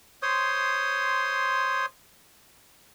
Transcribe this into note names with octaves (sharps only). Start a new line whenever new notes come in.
C5 C#5 C6 D#6